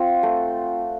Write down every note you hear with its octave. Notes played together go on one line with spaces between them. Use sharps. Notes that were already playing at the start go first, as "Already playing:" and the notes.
Already playing: C4 F4 F#5
A3